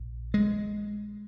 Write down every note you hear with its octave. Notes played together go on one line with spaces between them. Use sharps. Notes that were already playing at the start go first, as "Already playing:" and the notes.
Already playing: A#1
G#3